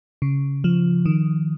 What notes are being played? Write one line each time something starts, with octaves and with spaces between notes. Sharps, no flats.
C#3
F3
D#3